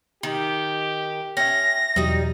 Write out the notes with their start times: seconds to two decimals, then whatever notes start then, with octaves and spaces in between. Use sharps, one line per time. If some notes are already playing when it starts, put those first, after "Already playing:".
0.23 D#3 G4
1.37 C#4 E5 G5 A#6
1.96 E2 B2 F#3 G3 D#4